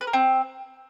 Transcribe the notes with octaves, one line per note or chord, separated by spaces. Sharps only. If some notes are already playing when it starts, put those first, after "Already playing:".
B4
A#4
C4